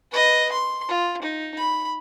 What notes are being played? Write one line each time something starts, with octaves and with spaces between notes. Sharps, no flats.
B4 D#5
C6
F4
D#4
B5